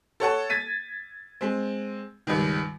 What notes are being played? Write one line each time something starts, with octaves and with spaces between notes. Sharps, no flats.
A4 C#5 F#5 A5
G#6 A6 B6 D#7
G#3 C4
C#2 G2 D#3